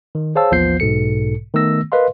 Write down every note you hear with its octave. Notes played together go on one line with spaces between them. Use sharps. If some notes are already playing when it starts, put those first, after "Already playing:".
D#3
G#4 C5 C#5 F5 A5 E6
A1 D#2 F3 B3 G6 C7
B1 G#2 B2 A4 C#7
D#3 A3 B3 E6 A#6
A#4 B4 D#5 F5 C6